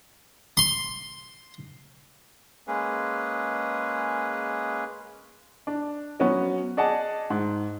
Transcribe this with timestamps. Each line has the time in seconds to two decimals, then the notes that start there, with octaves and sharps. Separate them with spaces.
0.57 C6
2.68 G#3 A#3 C#4 G#4 B4
5.67 D4
6.19 F#3 B3 C#4 F#4
6.77 G#4 D5 D#5 F#5 A5
7.30 G#2